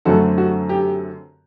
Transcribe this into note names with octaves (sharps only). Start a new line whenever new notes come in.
F#2 D3 A3 C4 F#4 A4
F#4
G4